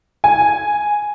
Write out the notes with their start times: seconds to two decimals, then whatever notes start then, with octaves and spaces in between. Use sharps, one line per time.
0.24 G#5